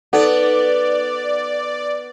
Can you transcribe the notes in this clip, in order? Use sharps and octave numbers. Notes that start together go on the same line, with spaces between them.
B3 D#4 A4 D5 F#5